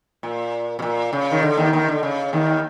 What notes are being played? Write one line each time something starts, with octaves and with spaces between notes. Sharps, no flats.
A#2
B2
A#2
C#3
D#3
D3
D#2 D#3
D#2 D#3
D3
C#3
D#2 D#3